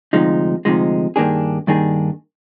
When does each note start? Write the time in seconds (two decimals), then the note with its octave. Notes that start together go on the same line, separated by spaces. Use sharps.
0.13 D2 C3 F3 G#3 D#4
0.65 D2 C3 F3 G#3 D#4
1.16 G2 D#3 A#3 D4 G#4
1.67 G2 D#3 A#3 D4 G#4